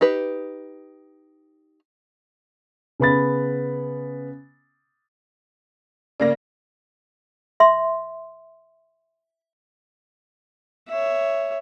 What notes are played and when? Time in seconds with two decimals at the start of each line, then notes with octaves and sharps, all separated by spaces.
0.01 D#4 G4 B4
3.00 C#3 B3 B5 A6
6.20 C#3 A#3 D5 A#6
7.60 E5 C6
10.89 C#5 E5